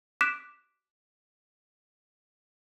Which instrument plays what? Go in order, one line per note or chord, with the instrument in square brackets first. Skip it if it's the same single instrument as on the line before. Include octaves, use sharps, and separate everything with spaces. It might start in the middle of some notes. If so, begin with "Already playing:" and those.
[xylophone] D6 F#6 B6 D7 E7